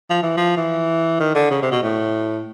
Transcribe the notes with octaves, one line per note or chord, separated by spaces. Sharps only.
F3
E3
F3
E3
D#3
D3
C#3
C3
B2
A2